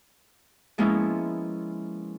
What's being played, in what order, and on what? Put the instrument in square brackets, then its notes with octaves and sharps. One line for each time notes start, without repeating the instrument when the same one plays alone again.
[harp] F3 G#3 A#3 B3 C#4 E4